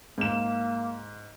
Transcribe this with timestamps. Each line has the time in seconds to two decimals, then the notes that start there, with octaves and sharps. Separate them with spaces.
0.18 G#2 A#3 E7